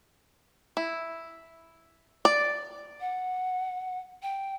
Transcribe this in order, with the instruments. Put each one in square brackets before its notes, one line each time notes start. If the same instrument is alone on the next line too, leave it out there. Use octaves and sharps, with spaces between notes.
[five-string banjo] E4
D5
[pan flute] F#5
G5